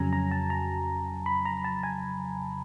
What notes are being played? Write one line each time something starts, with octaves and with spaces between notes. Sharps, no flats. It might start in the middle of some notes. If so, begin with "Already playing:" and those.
Already playing: F2 C#3 F#3 G#5 A#5
A#5
A5
A#5
B5
A#5
A5
G#5